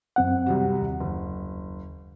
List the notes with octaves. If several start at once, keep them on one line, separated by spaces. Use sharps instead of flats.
F#2 C4 F#5
C2 C3 F#4
D#2
F#1